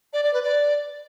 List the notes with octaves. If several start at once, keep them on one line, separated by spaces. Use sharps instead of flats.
D5
D5
B4
D5